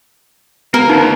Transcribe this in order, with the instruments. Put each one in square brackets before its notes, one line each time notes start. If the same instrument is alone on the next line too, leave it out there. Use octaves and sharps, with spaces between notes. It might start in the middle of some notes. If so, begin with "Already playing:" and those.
[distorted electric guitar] A#3 [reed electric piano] B3 [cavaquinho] A#4
[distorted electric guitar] D2 [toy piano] D#4